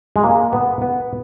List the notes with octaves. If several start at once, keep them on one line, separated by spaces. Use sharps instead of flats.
G#3
A#3
B3
B3